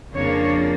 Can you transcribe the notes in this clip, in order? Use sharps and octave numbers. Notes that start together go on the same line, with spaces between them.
F2 C#3 F3 A#3 D4 C#5